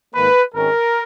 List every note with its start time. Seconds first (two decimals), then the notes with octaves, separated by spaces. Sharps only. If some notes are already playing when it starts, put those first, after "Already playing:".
0.14 G#2 D#3 A#3 B4
0.53 G#1 G#2 D#3 G#3 C#4 A#4